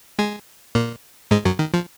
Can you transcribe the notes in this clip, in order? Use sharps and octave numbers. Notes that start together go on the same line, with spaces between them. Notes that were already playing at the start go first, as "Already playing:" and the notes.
G#3 G#4
A#2 A#3
G#2 G#3
F#2 F#3
D#3
F3